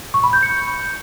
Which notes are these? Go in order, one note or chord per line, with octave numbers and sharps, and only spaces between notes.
C#6
B5
G6
C#7